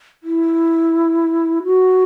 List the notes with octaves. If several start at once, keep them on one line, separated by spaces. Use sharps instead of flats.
E4
F#4